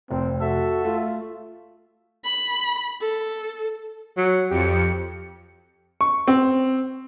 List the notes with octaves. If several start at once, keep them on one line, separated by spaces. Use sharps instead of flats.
F1 C4
F#4 A4 E5
A3 F4
B5
A4
F#3
F2 G4 C#7
C#6
C4